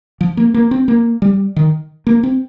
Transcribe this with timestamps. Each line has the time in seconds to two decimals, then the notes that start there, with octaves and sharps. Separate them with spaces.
0.21 F3
0.37 A#3
0.54 A#3
0.71 C4
0.88 A#3
1.22 G3
1.56 D#3
2.07 A#3
2.23 C4